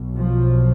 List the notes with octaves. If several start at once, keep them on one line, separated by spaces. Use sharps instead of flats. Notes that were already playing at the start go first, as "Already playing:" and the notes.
Already playing: B1 B2
F3